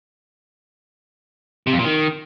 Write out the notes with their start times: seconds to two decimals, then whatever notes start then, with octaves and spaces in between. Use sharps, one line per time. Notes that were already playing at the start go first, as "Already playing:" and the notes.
1.67 C3
1.73 F2
1.79 A#2
1.85 D#3